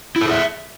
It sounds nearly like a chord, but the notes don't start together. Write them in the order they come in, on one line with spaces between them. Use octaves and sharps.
E4 A4 G#4 E5